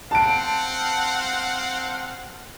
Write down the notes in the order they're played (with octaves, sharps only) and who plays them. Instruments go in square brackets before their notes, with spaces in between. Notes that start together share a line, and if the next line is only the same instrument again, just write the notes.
[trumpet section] C4 F5 F#5 [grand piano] A5 D7